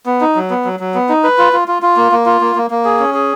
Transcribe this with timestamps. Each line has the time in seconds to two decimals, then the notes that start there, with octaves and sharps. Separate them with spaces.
0.06 B3
0.21 D#4
0.35 F#3
0.50 B3
0.65 F#3
0.80 F#3
0.94 B3
1.09 D#4
1.24 B4
1.38 F4
1.53 F4
1.68 F4
1.82 F4
1.97 A#3
2.12 A#3
2.26 F4
2.41 A#3
2.56 A#3
2.70 A#3
2.85 G#4
2.99 C#4
3.14 G#4